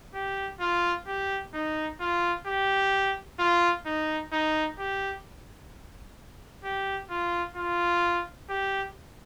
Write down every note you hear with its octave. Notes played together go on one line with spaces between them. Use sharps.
G4
F4
G4
D#4
F4
G4
F4
D#4
D#4
G4
G4
F4
F4
G4